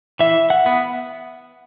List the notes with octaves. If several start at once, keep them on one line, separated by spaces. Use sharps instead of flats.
E3 E5
F#5
B3